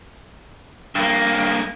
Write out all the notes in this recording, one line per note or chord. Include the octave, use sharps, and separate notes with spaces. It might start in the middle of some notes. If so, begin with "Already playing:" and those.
G2 A#3